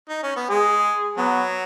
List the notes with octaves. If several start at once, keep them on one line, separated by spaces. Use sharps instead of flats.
D#4
C#4
B3
G#3 G#4
F#3 B3